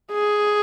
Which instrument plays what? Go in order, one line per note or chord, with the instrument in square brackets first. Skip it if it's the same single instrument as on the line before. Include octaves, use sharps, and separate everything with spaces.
[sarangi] G#4